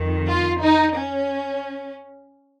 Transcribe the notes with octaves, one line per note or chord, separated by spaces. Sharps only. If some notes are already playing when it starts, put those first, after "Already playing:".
Already playing: F2 D#3
F4
D#4
C#4